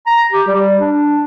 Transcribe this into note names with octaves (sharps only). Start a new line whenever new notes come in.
A#5
G4
G3
D4